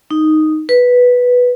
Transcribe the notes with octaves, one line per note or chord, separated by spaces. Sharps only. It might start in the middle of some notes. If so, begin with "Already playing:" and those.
D#4
B4